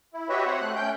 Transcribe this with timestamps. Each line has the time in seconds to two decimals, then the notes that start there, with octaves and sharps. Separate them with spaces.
0.14 E4
0.29 F#4 G4 B4 C#5 D#5 E5
0.45 C4 C5 C#5 F#5
0.61 A3 F#6
0.76 A3 C#4 G5 G6